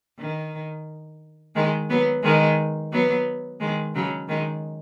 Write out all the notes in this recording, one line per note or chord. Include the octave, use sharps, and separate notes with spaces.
D#3
D#3 G#3
F#3 B3
D#3 G#3
F#3 B3
D#3 G#3
C#3 F#3
D#3 G#3